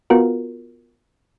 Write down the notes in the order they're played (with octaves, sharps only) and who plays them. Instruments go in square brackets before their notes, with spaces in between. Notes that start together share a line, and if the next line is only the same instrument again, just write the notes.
[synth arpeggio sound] B3 F4 F#4 A#4